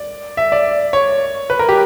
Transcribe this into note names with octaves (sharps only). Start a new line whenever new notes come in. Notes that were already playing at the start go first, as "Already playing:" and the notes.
Already playing: D5
E5
D5
C#5
B4
A#4
G4